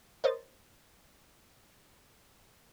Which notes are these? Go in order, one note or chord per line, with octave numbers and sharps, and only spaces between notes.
A#4 C5 C#5 D#5 A6